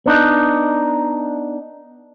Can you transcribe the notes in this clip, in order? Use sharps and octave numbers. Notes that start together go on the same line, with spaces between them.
B3 D4 D#4